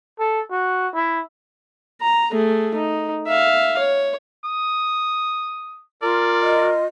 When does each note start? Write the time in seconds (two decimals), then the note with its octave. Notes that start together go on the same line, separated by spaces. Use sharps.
0.19 A4
0.51 F#4
0.94 E4
2.01 A#5
2.31 A3 G#4
2.74 D#4
3.27 E5 F5
3.78 C#5
4.45 D#6
6.02 F4 A#4 D5
6.42 D#5